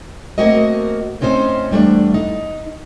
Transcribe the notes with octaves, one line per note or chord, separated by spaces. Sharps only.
A3 A#3 C4 F#4 A#4 D#5
A2 C4 C#4 D#4 C5
E2 G3 A3 D4
D#4